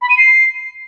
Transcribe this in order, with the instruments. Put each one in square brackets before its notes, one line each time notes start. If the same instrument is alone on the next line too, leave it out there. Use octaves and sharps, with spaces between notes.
[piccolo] B5
D#7
C7